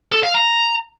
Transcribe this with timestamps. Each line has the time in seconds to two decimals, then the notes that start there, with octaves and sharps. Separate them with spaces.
0.12 A4
0.23 F5
0.34 A#5